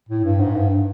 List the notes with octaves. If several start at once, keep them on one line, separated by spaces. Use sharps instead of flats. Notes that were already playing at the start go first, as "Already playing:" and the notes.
A2
G2
G#2
G2